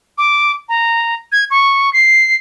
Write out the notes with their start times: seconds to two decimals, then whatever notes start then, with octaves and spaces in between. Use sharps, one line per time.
0.18 D6
0.69 A#5
1.32 G#6
1.51 C#6
1.93 C7